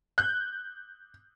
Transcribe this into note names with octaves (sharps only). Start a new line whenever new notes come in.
F#6 G6